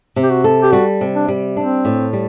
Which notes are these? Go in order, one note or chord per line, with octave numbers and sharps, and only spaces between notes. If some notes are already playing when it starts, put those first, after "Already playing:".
C3
G4
F#4
A4
G4
G3 F#4
C3
D4
G3
C4 D4
A2
G3